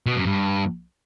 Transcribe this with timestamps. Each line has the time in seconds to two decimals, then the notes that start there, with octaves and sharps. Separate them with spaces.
0.06 B2
0.16 F#2
0.26 G2